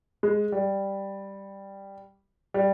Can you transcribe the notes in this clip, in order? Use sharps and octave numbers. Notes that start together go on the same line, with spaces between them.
G#3
G3
G3